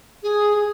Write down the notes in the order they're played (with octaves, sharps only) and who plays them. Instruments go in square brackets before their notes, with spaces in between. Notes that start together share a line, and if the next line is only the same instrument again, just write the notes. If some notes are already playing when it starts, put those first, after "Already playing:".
[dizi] G#4